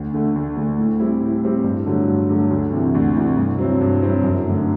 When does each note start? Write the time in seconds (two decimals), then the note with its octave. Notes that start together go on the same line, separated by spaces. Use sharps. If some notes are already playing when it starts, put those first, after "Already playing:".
Already playing: D2
0.13 D3 A3
0.35 D2
0.57 D3 A3
0.78 A2
0.99 G3 C4 E4
1.21 A2
1.43 G3 C4 E4
1.64 G2
1.86 D3 F#3 A3
2.08 G2
2.29 D3 F#3 A3
2.50 D2
2.73 C3 E3
2.94 D2
3.16 C3 E3
3.37 G2
3.58 F#3 C4 E4
3.81 G2
4.02 F#3 C4 E4
4.23 F#2
4.45 D3 A3